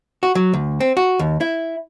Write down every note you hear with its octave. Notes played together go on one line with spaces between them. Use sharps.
F#4
F#3
D2
C4
F#4
D#2
E4